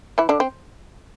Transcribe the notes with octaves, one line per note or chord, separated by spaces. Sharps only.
E3 E4
D3 D4
C4